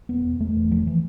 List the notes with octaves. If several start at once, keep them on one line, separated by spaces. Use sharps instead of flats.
E1 B3
E1
E1 A3
E2
F1 F3
E3